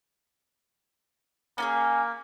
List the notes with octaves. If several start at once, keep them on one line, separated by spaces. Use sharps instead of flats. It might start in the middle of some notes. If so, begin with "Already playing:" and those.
A#3 C#4 F4 G#4